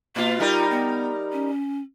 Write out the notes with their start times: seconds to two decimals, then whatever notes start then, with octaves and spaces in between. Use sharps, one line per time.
0.16 B2 A#3 F4
0.40 G3 D#4 F4 A#4
0.70 B3
1.32 C#4